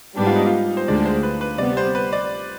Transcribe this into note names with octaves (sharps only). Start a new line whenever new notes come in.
G#2 G3 B3 D4 G4
F4
D#4
F4
C5
D2 D3 G#3 D4 D5
C5
B4
B4
C3 G3 B3 D5
C5
B4
D5